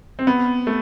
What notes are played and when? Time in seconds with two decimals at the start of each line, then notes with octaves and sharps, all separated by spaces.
0.19 C4
0.27 B3
0.67 A3